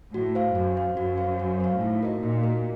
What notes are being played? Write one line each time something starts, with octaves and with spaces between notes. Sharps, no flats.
A2 F#4
C5 F5
F#2 F#4
C5 F5
F#2 F#4
C5 F5
F#4
C5 F5
A2 D#4
F#4 A#4 D#5
A#2 D#4
F#4 A#4 D#5